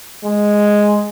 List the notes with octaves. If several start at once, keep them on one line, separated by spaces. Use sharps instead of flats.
G#3